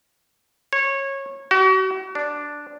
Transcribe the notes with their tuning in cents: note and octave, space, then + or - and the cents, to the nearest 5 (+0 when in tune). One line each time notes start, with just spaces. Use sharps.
C#5 -20
F#4 +40
D4 +0